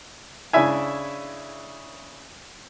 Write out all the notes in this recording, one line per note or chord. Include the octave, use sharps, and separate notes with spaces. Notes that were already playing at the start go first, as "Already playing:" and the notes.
C#3 D4 E4 E5 G#5